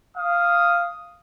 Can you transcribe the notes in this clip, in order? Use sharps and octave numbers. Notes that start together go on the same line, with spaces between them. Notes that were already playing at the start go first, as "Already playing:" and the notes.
F5 D#6